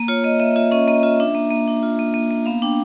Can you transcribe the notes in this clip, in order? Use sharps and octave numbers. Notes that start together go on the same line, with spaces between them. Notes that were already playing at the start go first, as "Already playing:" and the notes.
Already playing: A#3
F4 C#5
A#3 D#5
A#3 E5
F4 E5
C#4 D#5
A#3 D#5
F4 E5
D4 E5
A#3
A#3
D4
F4
A#3
A#3
A#3
B3 F5
D4 G5